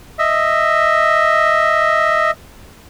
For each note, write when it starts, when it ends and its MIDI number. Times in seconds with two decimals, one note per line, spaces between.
0.19 2.31 75
0.19 2.31 76